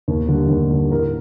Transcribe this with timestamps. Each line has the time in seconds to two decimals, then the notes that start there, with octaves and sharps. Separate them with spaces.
0.08 D#2
0.28 D3
0.34 G3
0.50 D#2
0.70 D3 G3
0.91 A2 A#4